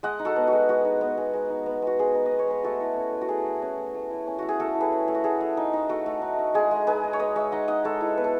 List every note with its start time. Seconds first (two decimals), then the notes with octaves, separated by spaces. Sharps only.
0.03 G#3 D#5 F#5
0.19 D#4
0.25 F#4 A4
0.36 B3
0.47 F#4
0.53 G#3
0.69 G#3 F#4
0.85 D#4
1.01 B3
1.18 G#3
1.34 G#3
1.50 D#4
1.66 B3
1.82 G#3 F#4
1.99 G#3 G#4
2.15 D#4
2.26 D#5
2.31 B3
2.39 C#5
2.48 G#3 B4
2.63 A3 F#4 A4
2.80 E4
2.96 C#4
3.13 A3
3.21 F#4
3.28 A3 G#4
3.46 E4
3.62 C#4
3.78 A3
3.95 A3
4.10 E4
4.27 C#4
4.38 A3 F#4
4.49 G#4
4.59 A3 F#4 A4
4.75 E4
4.80 G#4 B4
4.92 C#4
5.08 A3
5.15 F#4
5.24 A3 G#4
5.41 A3
5.57 D#4
5.73 D#4
5.89 A3 F#4
6.06 A3
6.22 D#4
6.39 D#4
6.54 G#3 G#4
6.71 G#3
6.87 D#4 G#4 B4
7.04 D#4
7.13 C#5
7.19 G#3 B4 D#5
7.35 G#3 C#5 E5
7.52 D#4 D#5 F#5
7.68 D#4 D#5 F#5
7.84 G#3 A4 C#5
8.01 E4
8.17 B3 B4
8.24 A4